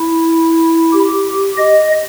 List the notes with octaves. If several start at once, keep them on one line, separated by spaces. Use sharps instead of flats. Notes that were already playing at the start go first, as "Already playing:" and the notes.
Already playing: E4
G4
D#5